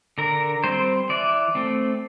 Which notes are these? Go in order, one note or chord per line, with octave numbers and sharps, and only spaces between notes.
D3 A#4
G3 C4 C5
E3 D5
A3 C4